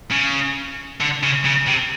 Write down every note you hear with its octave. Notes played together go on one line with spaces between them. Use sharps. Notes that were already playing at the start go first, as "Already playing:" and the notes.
C#3
D3
C#3
C#3
C3